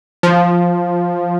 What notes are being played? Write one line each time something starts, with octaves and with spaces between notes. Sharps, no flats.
F3